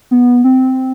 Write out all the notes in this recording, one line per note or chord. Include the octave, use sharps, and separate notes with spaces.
B3
C4